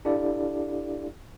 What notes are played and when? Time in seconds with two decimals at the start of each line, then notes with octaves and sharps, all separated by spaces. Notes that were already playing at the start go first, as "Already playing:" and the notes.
0.05 D4 E4 G4 A4 D5 F5